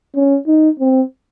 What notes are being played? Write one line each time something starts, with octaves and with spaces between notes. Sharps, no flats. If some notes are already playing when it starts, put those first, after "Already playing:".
C#4
D#4
C4